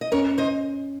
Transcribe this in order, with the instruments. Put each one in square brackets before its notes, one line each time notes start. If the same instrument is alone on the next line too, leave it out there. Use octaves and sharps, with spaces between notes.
[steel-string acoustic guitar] D#5
[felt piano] C#4 [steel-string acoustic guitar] A#4 C#5
[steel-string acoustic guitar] C5 D#5